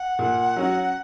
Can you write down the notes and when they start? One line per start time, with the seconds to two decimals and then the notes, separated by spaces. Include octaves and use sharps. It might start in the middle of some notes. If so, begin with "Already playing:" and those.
Already playing: F#5
0.19 A#2
0.56 F#3 C#4 F#4